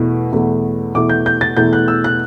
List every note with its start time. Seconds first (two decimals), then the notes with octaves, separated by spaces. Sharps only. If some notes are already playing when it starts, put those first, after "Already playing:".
Already playing: E2 B2 A3 E4
0.32 E2 B2 A3 E4
0.95 E2 B2 A3 E4 D6
1.09 G6
1.26 G6
1.41 A6
1.57 E2 B2 A3 E4 G6
1.73 F#6
1.88 E6
2.04 F#6